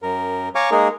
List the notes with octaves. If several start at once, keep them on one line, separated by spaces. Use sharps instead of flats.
F#2 A#4
C#5 F5 G#5 A#5 C#6 D6
G#3 A#3 D#4 G#4 A#4